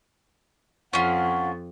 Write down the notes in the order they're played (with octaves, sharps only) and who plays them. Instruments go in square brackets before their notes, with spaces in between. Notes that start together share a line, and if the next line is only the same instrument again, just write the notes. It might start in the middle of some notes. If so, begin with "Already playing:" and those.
[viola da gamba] F2 [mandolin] C#4 F4 [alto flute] F#5